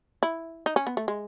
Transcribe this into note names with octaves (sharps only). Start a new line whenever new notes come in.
E4
D#4
C#4
B3
A3
G#3